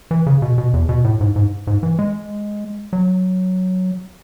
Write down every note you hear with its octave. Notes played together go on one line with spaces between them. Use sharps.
E3
C#3
B2
B2
E2
B2
A2
G#2
G#2
G#2
E3
G#3
F#3